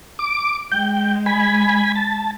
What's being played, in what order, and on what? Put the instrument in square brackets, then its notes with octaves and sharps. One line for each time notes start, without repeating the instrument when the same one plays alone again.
[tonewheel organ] D6
[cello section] G#3 [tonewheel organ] G5
[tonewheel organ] G#5 B5
A5